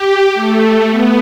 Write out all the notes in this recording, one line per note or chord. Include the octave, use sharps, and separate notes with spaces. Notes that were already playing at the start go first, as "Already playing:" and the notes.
Already playing: G4
A3
B3